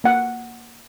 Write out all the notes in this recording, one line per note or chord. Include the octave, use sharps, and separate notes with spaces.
A#3 F#5